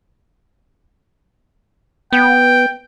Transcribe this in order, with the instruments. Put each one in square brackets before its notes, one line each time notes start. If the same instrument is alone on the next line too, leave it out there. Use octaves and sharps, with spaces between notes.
[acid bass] B3 [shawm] G5